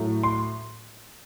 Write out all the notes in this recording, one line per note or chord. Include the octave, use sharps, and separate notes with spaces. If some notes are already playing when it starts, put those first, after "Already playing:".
Already playing: A2 F#3 A3
C6